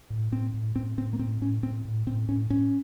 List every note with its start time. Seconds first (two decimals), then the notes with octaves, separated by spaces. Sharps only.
0.10 A2
0.32 A2 C4
0.54 A2
0.76 A2 C4
0.98 A2 C4
1.13 A#3
1.19 A2 C4
1.41 A2 C#4
1.63 A2 C4
1.85 A2
2.06 A2 C4
2.28 A2 C#4
2.50 A2 C#4